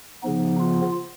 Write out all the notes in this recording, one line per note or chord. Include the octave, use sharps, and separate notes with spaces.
C#3 F3 B3 D#4
F4